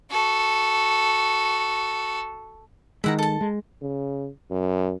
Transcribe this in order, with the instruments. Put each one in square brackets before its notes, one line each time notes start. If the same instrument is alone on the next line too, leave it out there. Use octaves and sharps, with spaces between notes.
[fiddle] F#4 A4
[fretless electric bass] D#3 G#3 [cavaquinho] E4 F#5 A#5
[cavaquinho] A4 A5
[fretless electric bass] G#3
[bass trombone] C#3
F#2